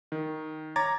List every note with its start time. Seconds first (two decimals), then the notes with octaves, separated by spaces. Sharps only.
0.12 D#3
0.76 C#5 A#5 D6 G#6 A6